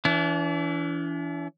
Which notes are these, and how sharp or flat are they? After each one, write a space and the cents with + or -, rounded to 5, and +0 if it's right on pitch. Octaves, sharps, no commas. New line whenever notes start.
E3 +15 D4 -45